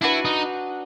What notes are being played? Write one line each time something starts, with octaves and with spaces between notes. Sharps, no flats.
D4 E4 F#4 B4
D#4